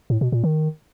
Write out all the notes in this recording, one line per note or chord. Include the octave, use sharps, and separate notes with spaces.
A2
B2
A#2
D#3